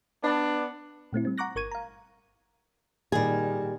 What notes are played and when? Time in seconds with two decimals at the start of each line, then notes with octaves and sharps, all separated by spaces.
0.23 B3 D4
1.13 A#2 A3 C4 E4
1.25 G3 C4
1.38 F#5 A#5 C#6 D6 F#6 A#6
1.56 G1 A#4 C#6 G#6 D#7
1.71 F5 A#5
3.12 A#2 D#3 G3 G#4